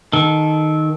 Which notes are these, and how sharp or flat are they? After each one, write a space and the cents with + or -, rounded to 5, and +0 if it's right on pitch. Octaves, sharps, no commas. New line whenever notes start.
D#3 +0 A4 -15